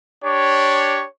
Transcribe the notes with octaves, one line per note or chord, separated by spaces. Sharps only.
D4 G4 C#5